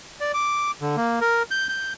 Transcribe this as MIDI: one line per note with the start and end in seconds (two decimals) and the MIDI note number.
0.20 0.32 74
0.34 0.71 86
0.82 0.96 50
0.97 1.19 58
1.21 1.43 70
1.51 1.68 91
1.69 1.93 91